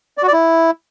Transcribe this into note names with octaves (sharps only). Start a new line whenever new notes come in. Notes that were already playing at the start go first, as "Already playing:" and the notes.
D5
F#4
D5
E4